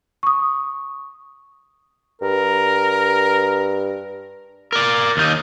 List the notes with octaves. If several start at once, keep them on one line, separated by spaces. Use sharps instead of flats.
C#6 D#6
G2 A#4
A#4 D5
D#2 D#4